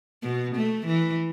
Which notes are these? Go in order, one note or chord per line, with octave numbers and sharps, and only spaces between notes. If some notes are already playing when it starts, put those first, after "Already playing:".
B2
A3
E3